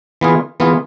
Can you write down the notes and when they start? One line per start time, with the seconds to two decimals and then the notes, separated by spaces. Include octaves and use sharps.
0.21 E3 B3 F4 G#4
0.60 E3 B3 F4 G#4